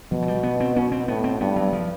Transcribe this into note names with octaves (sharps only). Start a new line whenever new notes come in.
B2 F3
F#3
G3
B3
C4
B2 C#4
C4
A2 B3
C4
G2 B3
F#3
F3